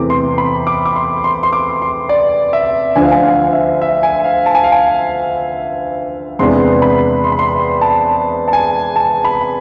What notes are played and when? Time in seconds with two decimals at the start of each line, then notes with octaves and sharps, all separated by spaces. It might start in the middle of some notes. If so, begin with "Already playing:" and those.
Already playing: E2 C3 E3 A3 C4 D6
0.10 C6
0.38 B5
0.67 D6
0.86 D6
0.96 C6
1.24 C6
1.43 C6
1.53 D6
1.82 C6
2.09 D5
2.53 E5
2.95 D2 D3 F3 G#5
3.04 F5
3.11 G#5
3.24 F5
3.53 E5
3.82 E5
4.03 G#5
4.24 F5
4.46 A5
4.55 G#5
4.64 F5
4.72 G#5
6.39 E2 C3 G#3 B3 D4 C6
6.82 B5
7.24 C6
7.32 B5
7.39 C6
7.81 A5
8.48 A5
8.53 G#5
8.96 A5
9.25 B5